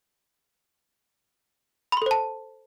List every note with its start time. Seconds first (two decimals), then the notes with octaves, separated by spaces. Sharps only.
1.92 B5
1.97 C6
2.02 A4
2.06 C5
2.11 A5